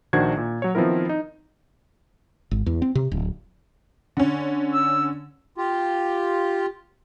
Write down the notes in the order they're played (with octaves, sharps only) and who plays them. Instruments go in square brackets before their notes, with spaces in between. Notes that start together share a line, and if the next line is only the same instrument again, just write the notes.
[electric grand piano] A#1 D#3 D4 F#4 C5 G#6
A#2
F#3 C#5
D#3 F3 B3 C4 E4 A#4
D#4
[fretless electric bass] G#1
E2
C4
C3
D1
[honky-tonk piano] D3 C#4
[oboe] E6
[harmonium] F4 G4